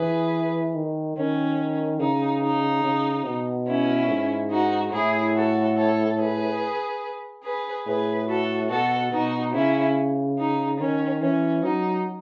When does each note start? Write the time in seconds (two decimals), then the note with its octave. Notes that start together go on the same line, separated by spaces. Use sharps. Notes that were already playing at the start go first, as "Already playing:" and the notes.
Already playing: E3 G#4 B4
0.74 D#3
1.16 D#3 C#4
2.00 C#3 D#4
2.42 D#4
2.84 C#3
3.25 B2
3.67 C#4 E4
4.09 G#2
4.51 D#4 F#4
4.93 A2 E4 G#4
5.35 F#4 A4
5.77 A4 C#5
6.19 G#4 B4
7.44 G#4 B4
7.86 A2 G#4 B4
8.28 F#4 A4
8.70 B2 F#4 A4
9.12 B2 D#4 F#4
9.54 C#3 C#4 E4
10.38 D#4
10.79 D#3 C#4
11.21 E3 C#4
11.63 F#3 D#4